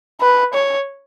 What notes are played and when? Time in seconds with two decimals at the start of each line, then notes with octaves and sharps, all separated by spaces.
0.21 B4
0.53 C#5